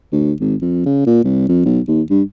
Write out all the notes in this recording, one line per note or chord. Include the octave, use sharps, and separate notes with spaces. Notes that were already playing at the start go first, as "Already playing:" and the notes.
D2
G#1
F2
C#3
A#2
C2
F2
B1
D#2
G2